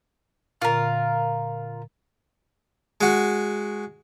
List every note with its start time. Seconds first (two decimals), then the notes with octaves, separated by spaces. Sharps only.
0.62 A#2 D3 F4 A#4
3.01 G#3 F#4